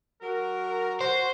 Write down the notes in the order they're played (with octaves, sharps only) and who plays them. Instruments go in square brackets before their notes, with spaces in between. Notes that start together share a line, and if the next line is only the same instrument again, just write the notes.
[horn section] F#3 F#4 A#4
[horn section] F#4 [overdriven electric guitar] C5